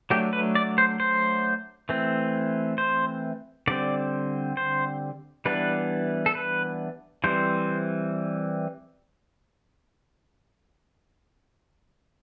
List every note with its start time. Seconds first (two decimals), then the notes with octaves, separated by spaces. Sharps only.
0.10 F#3 A3 D4 G4
0.33 B4
0.55 D5
0.78 C5
1.00 C5
1.89 E3 A3 C4
2.78 C5
3.67 D3 G3 C4 D5
4.57 C5
5.45 E3 G3 B3 D4 B4
6.26 A4
6.35 B4
7.24 E3 G3 C4 C5